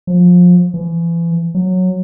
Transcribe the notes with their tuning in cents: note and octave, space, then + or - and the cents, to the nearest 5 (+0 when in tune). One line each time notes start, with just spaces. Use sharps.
F3 +25
E3 +35
F#3 -10